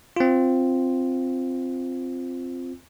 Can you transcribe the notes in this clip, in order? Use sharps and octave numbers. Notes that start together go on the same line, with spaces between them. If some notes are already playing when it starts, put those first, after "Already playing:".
C4 F4